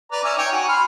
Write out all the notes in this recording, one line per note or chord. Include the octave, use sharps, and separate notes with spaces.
B4 D5 A#5
C#4 D5 E5
D#4 C#5 G5
F#4 G#5
B5 C6 F6